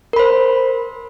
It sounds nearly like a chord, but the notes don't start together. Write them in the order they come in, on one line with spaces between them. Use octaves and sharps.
A#4 B5 C5